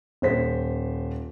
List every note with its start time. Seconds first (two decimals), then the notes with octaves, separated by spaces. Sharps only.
0.22 D#1 C5 B6